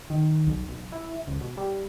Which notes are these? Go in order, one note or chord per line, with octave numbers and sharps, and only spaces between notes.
D#3
B1
B1
E4
C#2
B2
G3